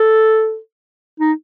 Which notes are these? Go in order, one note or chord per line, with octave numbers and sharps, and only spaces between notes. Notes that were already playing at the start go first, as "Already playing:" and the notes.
Already playing: A4
D#4